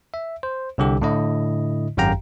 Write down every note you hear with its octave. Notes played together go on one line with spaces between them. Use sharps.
E5
C5
C2 D3 G4
A2 D3 E4 D#5
G#1 F#2 G4 F5 G5 A#5